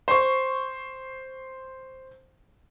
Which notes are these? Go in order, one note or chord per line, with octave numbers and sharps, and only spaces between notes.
C5 C#6